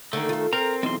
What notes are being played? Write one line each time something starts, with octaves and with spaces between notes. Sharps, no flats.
D3 D#3 A3 A#3
F4 A4
C4 A#4 A#5
B1 E2 C4 D#4 C6